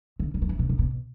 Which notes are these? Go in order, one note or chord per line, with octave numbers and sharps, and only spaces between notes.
D3
D3
F#3
E3
B2
C#3
B2